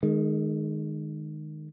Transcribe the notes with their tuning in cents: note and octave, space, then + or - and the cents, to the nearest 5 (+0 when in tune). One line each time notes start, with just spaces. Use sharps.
D#3 -20 G#3 +15